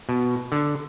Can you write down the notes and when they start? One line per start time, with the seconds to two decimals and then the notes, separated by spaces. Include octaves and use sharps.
0.09 B2
0.52 D3